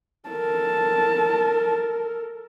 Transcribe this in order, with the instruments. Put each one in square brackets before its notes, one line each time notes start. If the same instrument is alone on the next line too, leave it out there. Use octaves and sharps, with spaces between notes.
[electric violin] A4 A#4 [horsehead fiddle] A5